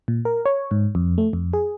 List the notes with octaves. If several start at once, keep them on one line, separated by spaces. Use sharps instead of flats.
A#2
A#4
C#5
G#2
F2
A3
F2
G#4